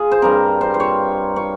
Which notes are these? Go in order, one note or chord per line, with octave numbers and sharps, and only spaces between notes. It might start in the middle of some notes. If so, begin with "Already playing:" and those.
Already playing: F4 G#4
C5
G2 G3 C4 A#4
C5
C5
C#5
C#5